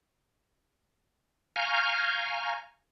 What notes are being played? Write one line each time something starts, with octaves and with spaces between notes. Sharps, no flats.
F5 G#5 A#5 C#6 F6 G6